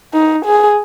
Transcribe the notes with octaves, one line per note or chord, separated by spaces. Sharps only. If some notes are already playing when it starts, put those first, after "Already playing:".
D#4
G#4